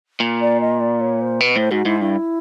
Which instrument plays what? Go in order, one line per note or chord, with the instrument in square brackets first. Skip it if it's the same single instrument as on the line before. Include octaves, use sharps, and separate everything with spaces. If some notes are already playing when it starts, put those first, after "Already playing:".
[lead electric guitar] A#2
[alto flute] D5
D#5
D5
C#5
C5
[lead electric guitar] B2 [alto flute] B4
[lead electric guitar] A2 [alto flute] C5
[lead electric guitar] G#2 [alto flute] F#4
[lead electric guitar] G#2 [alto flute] E4
[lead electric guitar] G2 [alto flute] E4